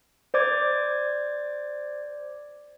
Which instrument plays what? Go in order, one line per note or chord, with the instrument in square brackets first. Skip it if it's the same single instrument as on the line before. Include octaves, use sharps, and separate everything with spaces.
[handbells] C5 D5 D6 G#6